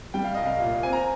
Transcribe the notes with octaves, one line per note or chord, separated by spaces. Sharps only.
G3 G5
F5
C2 D#5
F5
A#2
C4 G#5
A#5